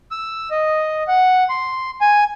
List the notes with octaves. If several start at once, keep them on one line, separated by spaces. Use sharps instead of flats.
E6
D#5
F#5
C6
G#5